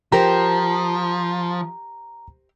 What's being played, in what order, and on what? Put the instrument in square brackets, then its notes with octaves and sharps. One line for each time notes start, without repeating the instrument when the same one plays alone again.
[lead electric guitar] F3 [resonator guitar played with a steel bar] G4 A#4 C5 [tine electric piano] A#5